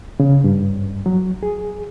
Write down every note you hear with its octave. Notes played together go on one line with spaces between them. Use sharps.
C#3
G2
F#3
G#4